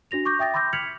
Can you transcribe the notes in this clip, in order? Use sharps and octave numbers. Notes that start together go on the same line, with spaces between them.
D4 F#4 A#6 F7
C#6 D6 G6 A#6
E5 G5 D#6 A6 A#6
B5 C6 D6 E6 G6 A#6
F6 G#6 B6 C#7 F7 F#7